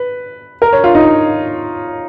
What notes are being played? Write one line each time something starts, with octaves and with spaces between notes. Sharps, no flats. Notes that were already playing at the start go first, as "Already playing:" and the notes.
Already playing: B4
A#4
C#5
F4
D#4